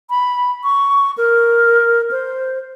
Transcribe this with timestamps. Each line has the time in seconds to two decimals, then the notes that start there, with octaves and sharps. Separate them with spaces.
0.10 B5
0.64 C#6
1.17 A#4
2.11 C5